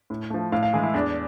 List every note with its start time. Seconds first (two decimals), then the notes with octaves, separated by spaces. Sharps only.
0.10 A2
0.30 F3 A3
0.52 A2 F5
0.63 F5
0.73 E3 G#3 G#4
0.83 E4
0.94 E2 D4